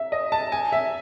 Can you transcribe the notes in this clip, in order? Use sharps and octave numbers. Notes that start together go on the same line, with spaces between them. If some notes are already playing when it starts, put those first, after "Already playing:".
Already playing: E5
D#5
A5
G#5
E5